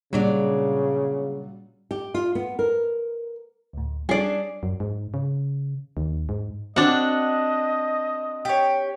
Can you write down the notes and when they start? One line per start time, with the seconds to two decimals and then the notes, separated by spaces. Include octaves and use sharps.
0.13 A#2 C#3 F#3 G3 D4 D5
1.91 G4
2.14 F4
2.35 B3
2.59 A#4
3.73 D2 A2
4.09 G3 C#4 D4 G#4 D5 C7
4.63 F#2
4.80 G#2
5.14 C#3
5.97 D#2
6.29 G#2
6.76 C4 D4 F#4 D#5 F#5
8.45 G4 C#5